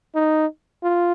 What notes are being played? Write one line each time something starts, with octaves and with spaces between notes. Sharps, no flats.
D#4
F4